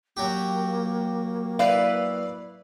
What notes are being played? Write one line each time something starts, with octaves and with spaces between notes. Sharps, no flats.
F#3 A#3 G4
E4 B4 D5 F5